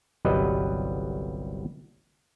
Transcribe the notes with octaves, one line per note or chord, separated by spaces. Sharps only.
G1 C2 F#3 G3 B4 D#5